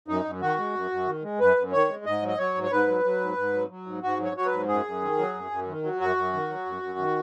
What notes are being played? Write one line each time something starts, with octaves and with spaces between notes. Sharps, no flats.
F#2 D#4
F#2
D#3 F#4
G#3
F#2
F#2
D#3
G#3
F#2 B4
F#2
D#3 C#5
G#3
G#2 D#5
F#3
D#5
F#3 C#5
G#2
C#5
G#2 B4
F#3
F#3
G#2
G#2
F#3
F#3
G#2
G#2 F#4
F#3
C#5
F#3 C#5
B4
G#2
F#2 G#4
F#2
D#3
F#3
F#2
F#2
D#3
F#3
F#2 F#4
F#2
D#3
F#3
F#2
F#2
D#3